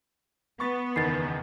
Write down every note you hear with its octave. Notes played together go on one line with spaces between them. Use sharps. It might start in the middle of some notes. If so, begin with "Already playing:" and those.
B3 C#6 A6
F#1 E2 D#3 A6 C7